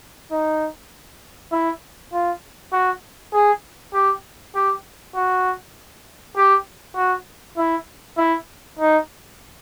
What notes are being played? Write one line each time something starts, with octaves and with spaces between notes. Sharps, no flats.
D#4
E4
F4
F#4
G#4
G4
G4
F#4
G4
F#4
E4
E4
D#4